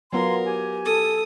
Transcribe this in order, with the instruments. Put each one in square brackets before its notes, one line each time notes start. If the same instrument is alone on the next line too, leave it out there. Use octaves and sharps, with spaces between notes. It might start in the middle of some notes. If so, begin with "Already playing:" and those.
[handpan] F#3 B3 F4 [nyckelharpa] A#4 [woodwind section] G#5 A#5 C6
[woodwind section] G4 G#5
[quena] A4 [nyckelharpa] D#6